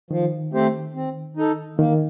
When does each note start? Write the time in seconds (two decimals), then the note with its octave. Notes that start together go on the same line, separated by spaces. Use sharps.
0.11 D#3 F3
0.53 A3 C4 G4 C5
0.95 C4
1.37 D#4 A4
1.79 D#3 A#3